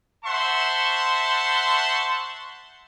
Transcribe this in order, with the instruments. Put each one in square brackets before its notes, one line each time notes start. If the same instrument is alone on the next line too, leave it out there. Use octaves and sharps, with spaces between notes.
[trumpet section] C5 E5 F#5 A5 C6 C#6